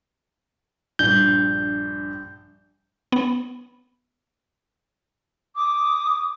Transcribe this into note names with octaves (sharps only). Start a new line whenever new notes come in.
A#1 G2 G6
B3
D6 D#6